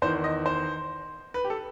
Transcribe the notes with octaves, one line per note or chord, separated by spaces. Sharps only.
E2 D#3 C5
D#5
C5
B4
G4
A4